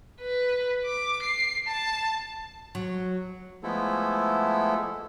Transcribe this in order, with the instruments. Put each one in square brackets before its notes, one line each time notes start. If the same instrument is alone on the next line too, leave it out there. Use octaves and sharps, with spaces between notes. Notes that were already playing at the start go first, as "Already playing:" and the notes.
[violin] B4
D6
C7
A5
[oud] F#3
[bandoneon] F3 G#3 A3 B3 E4 A4